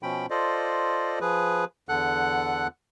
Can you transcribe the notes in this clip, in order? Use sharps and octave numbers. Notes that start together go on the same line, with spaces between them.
B2 F3 C#4 G5 B5
F4 A4 C5 D5 D#5
F3 G#4 B4
E2 D3 A4 F#5 F#6